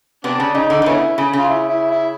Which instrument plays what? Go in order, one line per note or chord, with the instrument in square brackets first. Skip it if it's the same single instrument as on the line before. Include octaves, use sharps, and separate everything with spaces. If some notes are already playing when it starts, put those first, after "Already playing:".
[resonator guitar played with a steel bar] C3 [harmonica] B3 D4
[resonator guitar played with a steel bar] C#3
[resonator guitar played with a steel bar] C#3 [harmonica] D#4
[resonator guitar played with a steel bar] D3
D3
[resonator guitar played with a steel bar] C#3 [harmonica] B3 C#4 E4
[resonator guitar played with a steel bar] C#3
[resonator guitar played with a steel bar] C#3 [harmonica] F4
[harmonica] E4
E4
E4